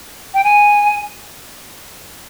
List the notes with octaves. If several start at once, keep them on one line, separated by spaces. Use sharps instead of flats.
G5
G#5